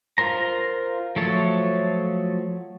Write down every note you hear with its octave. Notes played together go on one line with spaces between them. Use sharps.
F4 A#4 C5 A#5
F3 F#3 A3 A4 C#5